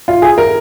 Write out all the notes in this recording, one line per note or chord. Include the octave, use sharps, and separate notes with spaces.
F4
G#4
A#4